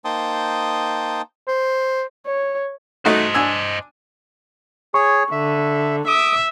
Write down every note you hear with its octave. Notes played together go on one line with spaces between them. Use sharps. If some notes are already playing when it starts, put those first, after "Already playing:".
A#3 D#4 C5 G5 A5 D#6
C5
C#5
A3 D#4 F#4 C5 D#5
D4 G#5 E6
G#4 C#5 C#6
D3 E5
E5 D6 D#6